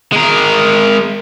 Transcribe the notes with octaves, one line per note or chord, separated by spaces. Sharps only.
G#3 A#4